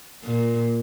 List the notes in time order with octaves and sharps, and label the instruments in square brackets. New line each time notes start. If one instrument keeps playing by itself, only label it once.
[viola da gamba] A#2